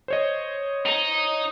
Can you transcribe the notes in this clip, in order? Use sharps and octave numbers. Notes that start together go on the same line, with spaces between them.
C5 C#5 D#5
D#4